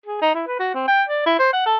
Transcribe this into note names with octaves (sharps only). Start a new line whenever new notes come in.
G#4
D#4
E4
B4
F#4
C4
G5
D5
E4
C5
F#5
A4